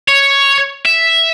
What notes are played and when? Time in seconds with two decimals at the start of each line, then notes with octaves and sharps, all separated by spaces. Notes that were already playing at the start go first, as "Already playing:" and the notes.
0.08 C#5
0.86 E5